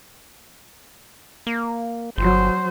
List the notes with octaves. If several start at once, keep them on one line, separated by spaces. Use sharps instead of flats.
A#3
G1 F#3 C5